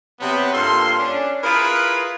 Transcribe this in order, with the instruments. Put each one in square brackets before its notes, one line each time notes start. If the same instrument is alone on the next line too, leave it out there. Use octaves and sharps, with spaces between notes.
[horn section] C3 F#3 B3
G2 A#3 F4 A4 C6
C#4 D4
E4 F4 G#4 A#4 B4